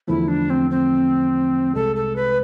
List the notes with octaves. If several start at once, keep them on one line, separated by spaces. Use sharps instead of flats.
E2 D3 F3 A3 E4
D4
C4
C4
C2 C3 G#3 A4
A4
B4